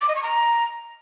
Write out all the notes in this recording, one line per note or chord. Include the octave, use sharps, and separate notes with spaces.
D6
D#5
C#6
A#5